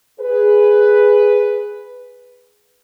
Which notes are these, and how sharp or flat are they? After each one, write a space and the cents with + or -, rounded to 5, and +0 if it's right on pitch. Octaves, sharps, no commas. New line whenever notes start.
G#4 +0 B4 +5